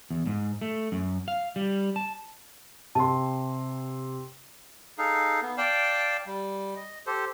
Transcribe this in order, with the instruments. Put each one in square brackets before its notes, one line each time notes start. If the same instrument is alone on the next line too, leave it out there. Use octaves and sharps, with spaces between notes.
[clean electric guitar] E2
G#2
A3
F#2
F5
G3
A5
[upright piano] C3 C6 [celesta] A5
[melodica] D#4 G#4 A4 F5
B3
D5 F5 G5 A5
G3
D#5
G4 A4 C5